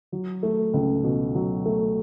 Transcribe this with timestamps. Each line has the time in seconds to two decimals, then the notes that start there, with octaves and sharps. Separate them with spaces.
0.12 F#3
0.43 A3
0.74 C#2
1.04 B2
1.35 F#3
1.65 A3